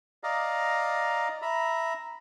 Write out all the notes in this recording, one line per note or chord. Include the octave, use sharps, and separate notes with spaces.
D5 D#5 F5 A#5
E5 A#5 B5